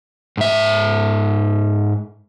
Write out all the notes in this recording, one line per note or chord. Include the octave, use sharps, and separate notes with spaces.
G#2 E5